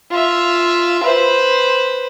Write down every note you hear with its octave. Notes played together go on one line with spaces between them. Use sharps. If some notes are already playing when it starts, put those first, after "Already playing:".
F4 E5
B4 C5